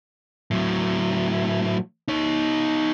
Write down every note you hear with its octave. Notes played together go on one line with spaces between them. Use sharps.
A2 F#3
D#4 C#5